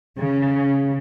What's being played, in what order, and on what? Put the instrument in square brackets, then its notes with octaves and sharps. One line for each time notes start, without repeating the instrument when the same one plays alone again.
[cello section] C#3